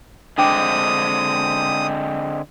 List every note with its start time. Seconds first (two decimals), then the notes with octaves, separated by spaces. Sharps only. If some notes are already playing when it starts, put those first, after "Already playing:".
0.38 D3 G#3 C4 D4 G5 D6 D#6